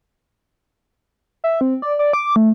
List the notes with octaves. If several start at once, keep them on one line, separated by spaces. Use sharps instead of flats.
E5
C4
D5
D5
D6
A3